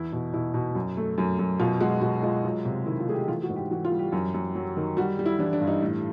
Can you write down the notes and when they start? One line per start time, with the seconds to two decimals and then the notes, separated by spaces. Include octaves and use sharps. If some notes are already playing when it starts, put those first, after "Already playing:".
Already playing: E2 E4
0.12 B2
0.33 B2 E4
0.54 B2
0.75 F#2
0.97 A3
1.18 F#2
1.39 F#2
1.59 B2 F4
1.80 G#3 F#4
2.01 B2 F#4
2.23 G#3 F4
2.44 F#3 F4
2.65 C3
2.86 D#3 E4
3.00 F4
3.07 A3 G#4
3.14 G4
3.28 E3 F4
3.43 F#4
3.49 G#2
3.56 G4
3.71 E3 F#4
3.85 F4
3.92 G3
3.99 G4
4.12 F#2
4.34 F#2
4.55 F#3
4.77 D#3
4.97 G3 F#4
5.19 G3
5.26 E4
5.39 E3 D4
5.53 D4
5.61 G2
5.68 D#4
5.82 A2